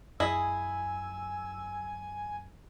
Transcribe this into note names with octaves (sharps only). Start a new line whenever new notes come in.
F#2 E4 G#4 D#5 G#5 E6